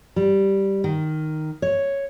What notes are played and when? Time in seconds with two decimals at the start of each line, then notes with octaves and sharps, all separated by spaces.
0.16 G3
0.84 D#3
1.62 C#5